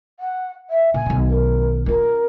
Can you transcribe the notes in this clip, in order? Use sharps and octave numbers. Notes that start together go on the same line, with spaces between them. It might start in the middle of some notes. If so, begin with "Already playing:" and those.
F#5
E5
A#2 D3 G#5
B1 D#3
A#4
C#4 F4 A#4